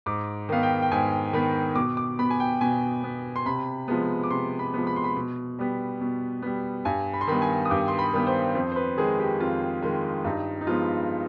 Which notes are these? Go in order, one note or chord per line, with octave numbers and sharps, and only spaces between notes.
G#2 D6
D#3 B3 F5
G5
G5
G#2 G#5
D#3 B3 B5
B2 D6
D6
B3 B5
G#5
G5
B2 G#5
B3
C6
C3 B5
F3 G#3 B3
D6
C3 C6
B5
F3 G#3 B3
B5
C6
B5
B2
G3 B3
B2
G3 B3
G2 G#5
B5
C6
D#3 G3 B3 B5
G#5
D#6
G2 D6
C6
B5
D#3 G3 B3
C5
F2 C5
C5
B4
D#3 G#3 G#4
G4
F2 F4
D#3 G#3
G2 D#4
D#4
F3 G#3 B3 F4